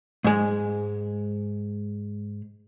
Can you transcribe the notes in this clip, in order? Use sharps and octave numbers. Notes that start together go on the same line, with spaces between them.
G#2 G#3